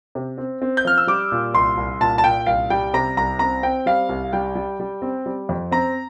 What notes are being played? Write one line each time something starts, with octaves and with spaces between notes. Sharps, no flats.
C3
C4
C4
G6
F3 F6
E6
G3 D6
A#2
C2 C6
C2
A#2 A5
A5
A#2 G5
C2 F5
G3 G5
C3 A#5
C2 A#5
C4 A#5
C4 G5
G3 F5
C2
G3 G5
G3
G3
C4
G3
F2
C4 A#5